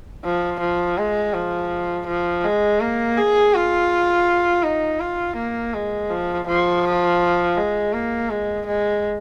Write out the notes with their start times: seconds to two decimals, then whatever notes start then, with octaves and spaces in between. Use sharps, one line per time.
0.25 F3
0.61 F3
0.98 G#3
1.34 F3
2.07 F3
2.44 G#3
2.81 A#3
3.17 G#4
3.54 F4
4.64 D#4
5.00 F4
5.37 A#3
5.74 G#3
6.10 F3
6.48 F3
7.57 G#3
7.94 A#3
8.30 G#3
8.67 G#3